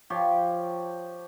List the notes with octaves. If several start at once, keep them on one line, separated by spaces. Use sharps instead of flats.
F3 G4 C#5 C6